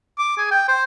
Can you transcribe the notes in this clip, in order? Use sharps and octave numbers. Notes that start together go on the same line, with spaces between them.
D6
G#4
G5
C5